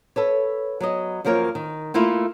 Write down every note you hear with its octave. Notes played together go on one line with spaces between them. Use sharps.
A4 B4 C#5
F#3 B3 D#5
F#2 F3 A#3 A#4 C#5
D#3
A3 A#3 E4 F4